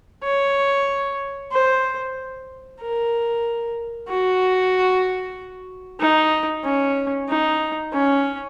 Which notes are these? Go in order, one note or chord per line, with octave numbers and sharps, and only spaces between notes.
C#5
C5
A#4
F#4
D#4
C#4
D#4
C#4